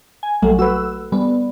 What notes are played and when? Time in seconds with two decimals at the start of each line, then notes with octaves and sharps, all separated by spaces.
0.23 G#5
0.42 A#1 F#3 G3 A3
0.59 F#4 B4 E6
1.12 G3 B3